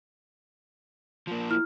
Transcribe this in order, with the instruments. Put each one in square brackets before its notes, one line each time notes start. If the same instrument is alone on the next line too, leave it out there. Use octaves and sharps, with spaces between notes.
[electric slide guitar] F3 A#3
[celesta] E4 F6